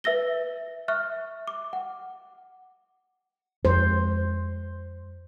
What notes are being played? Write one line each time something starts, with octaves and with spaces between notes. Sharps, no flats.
B4 E5 E6 A#6 G7
E5 C#6 F6 F#6
D6
F#5
F2 G#3 C5